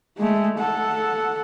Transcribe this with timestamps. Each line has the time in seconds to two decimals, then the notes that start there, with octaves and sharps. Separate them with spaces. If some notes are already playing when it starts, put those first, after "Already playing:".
0.18 G#3 A3
0.59 A4 F#5